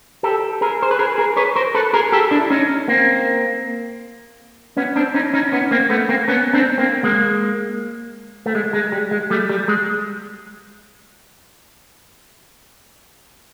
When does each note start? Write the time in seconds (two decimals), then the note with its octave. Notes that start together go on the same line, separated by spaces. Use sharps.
0.23 G4 A4
0.61 G#4 A#4
0.82 C5
0.91 B4
0.99 G#4 A#4
1.18 G#4 A#4
1.36 B4 C#5
1.56 A#4 C5
1.75 A4 B4
1.94 G#4 A#4
2.12 G4 A4
2.31 D4 E4
2.50 C#4 D#4
2.88 A#3 C4
4.77 B3 C#4
4.96 C4 D4
5.14 C#4 D#4
5.34 C#4 D#4
5.52 B3 C#4
5.71 A#3 C4
5.90 A3 B3
6.09 A#3 C4
6.28 B3 C#4
6.53 C4 D4
6.78 A#3 C4
7.03 G#3 A#3
8.46 A3
8.55 G#3
8.73 G#3
8.92 G3
9.11 G#3
9.30 G3 A3
9.49 G3
9.68 G#3